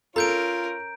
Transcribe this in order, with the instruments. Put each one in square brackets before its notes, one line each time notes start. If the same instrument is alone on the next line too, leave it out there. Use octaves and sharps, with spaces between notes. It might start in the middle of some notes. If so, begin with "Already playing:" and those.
[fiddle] C#4 A#4 [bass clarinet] F4 [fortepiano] A4 [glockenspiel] A#5 G6 D7